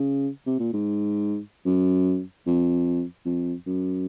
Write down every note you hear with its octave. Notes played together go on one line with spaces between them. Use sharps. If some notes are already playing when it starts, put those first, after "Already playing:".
Already playing: C#3
C3
A#2
G#2
F#2
F2
F2
F#2